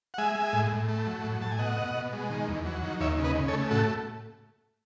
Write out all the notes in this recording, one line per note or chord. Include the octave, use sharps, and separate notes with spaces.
F#5
G#3 E5 G#5
G#3
A2
A2
A3
F#3
A2
A2 A5
G#5
B2 D#5 F#5
B2
B2
G#3
D#3
E2
F#3
D#3
D#2 C#5 E5
C#3
B4 D#5
C#3
A4 C#5
A3
A2 F#4 A4